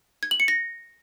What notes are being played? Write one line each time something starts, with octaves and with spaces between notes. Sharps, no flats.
G#6
F#7
C#7
A#6